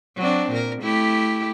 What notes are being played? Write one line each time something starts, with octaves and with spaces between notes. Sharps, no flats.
F#3 C4 D4
A#2 A#4
A3 E4 G4